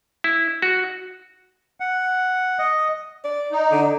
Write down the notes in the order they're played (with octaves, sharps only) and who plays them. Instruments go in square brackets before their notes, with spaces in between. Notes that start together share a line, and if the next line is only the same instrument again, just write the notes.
[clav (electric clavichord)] E4
F#4
[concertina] F#5
D#5
[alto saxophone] D5
[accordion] D#4
[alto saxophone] D3